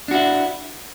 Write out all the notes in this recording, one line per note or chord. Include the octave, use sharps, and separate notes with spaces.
D4 E4 F#4